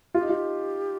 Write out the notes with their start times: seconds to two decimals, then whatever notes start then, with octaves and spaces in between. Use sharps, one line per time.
0.14 F4 G4
0.22 D#4
0.29 F4